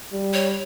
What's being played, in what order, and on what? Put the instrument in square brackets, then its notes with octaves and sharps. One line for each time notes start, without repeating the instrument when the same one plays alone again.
[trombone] G3
[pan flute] C#5